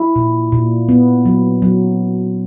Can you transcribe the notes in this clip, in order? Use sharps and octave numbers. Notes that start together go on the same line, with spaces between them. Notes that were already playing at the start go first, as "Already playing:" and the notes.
Already playing: E4
A#2
A#2
B3
F#3
F#3